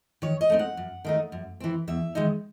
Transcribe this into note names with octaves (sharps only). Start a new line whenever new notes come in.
D#3 C#5
D#5
A3 C4 D#4
F#5
F#2
D#3 A3 D#4
F#2
E3 C4
E2 E5
D#3 G#3 D#4